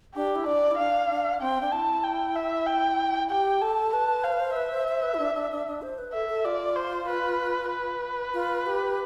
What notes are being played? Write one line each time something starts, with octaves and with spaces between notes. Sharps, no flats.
D4 G4
E4
D4 D5
E4
D4 F5
D4
C4 G5
D4
E4 A5
G5
E5
G5
G4 G5
A4 A5
B4 A5
C5 F5
B4
C5
B4 E5
C5
C5
B4
E4
D4
D4
D4
D4
C5
B4
A4 E5
A4
F4 D5
C5
B4
B4
F4
G4